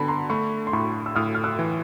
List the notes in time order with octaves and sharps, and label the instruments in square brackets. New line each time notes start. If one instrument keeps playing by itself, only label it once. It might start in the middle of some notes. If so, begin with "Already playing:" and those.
Already playing: [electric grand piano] D3 B3 [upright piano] A5 B5
[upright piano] A#5 C6
[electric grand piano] A3 [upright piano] B5 C#6
[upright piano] C6
[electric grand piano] A2 [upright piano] B5 C#6
[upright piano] E6
[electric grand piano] A2 [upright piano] D#6 F6
[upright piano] F6
E6 F#6
[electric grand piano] E3